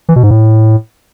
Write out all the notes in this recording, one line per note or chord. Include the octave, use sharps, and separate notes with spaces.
E3
B2
G#2
A2